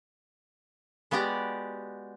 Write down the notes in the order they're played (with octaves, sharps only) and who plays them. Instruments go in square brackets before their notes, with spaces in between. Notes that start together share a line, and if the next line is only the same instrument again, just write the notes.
[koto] G#3 B3 F#4 G4 D5